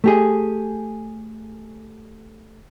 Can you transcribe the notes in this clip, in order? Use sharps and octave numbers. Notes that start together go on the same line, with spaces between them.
A3 G4 G#4